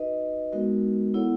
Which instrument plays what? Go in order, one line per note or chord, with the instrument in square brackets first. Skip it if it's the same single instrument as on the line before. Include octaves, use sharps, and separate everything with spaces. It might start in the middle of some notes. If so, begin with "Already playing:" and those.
Already playing: [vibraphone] D#4 F#4 B4 D#5
G#3 B3 D#4 F#4 A#4
B3 E4 A4 C#5 F#5